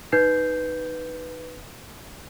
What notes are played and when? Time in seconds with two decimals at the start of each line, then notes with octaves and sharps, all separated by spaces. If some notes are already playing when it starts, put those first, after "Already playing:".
0.12 D#4 B4 G6 C7